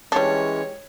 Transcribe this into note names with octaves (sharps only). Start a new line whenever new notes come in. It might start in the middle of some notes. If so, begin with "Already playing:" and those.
E3 G3 G#3 C#4 D4 C#5